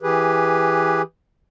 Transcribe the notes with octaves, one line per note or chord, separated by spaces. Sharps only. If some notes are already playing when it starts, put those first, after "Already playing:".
E3 G4 G#4 B4